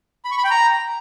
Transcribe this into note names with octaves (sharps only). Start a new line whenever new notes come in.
B5
C#6
B5
G5
A#5